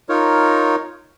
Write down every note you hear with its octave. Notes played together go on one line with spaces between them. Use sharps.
D#4 F4 A#4 C#5